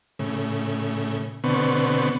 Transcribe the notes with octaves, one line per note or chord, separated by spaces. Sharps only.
A2 C#3
B2 D3 B3 C4 C#6